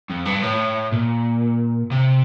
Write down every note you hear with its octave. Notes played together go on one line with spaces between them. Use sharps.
F2
G2
A2
A#2
C3